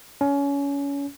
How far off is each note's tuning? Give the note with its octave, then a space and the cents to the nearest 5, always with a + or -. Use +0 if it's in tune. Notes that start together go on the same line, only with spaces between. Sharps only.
C#4 +25